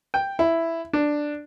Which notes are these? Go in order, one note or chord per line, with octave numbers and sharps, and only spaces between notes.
G5
E4
D4